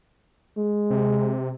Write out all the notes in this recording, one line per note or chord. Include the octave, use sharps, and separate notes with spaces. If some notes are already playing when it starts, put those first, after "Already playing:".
G#3
C3